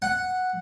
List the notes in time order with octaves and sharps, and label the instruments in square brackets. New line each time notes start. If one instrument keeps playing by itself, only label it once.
[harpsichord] F#5